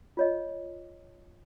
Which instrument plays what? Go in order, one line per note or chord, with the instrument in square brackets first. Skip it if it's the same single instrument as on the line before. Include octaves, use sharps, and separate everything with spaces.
[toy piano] F4 C#5 D#5